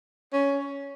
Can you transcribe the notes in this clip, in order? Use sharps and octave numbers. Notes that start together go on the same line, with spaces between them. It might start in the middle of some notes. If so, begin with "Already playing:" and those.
C#4